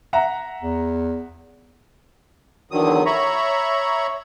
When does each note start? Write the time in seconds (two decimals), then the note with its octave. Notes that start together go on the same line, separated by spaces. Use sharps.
0.13 E5 F#5 A#5
0.61 E2
2.71 E2 D3 D#3 F#3 D#6
3.06 C#5 E5 A#5 B5 C#6